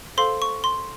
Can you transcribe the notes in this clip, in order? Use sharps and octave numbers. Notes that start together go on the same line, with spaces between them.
A4 C5 F5 C6
C#6
C6